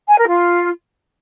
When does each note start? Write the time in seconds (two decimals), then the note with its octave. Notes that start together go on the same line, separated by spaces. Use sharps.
0.08 G#5
0.18 A#4
0.28 F4